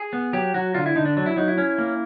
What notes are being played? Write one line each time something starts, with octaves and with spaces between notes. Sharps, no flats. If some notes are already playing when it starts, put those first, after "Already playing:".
Already playing: G#4
B3
F#3 G4
F#3 F#4
D3 F4
E4
D3 D#4
D4
F#3 D4
E4
F#3 D#4
E4
C#4
A#3